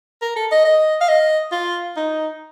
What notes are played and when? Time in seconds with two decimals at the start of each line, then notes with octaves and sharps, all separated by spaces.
0.22 A#4
0.36 A4
0.52 D#5
0.65 D#5
1.01 F5
1.09 D#5
1.52 F4
1.97 D#4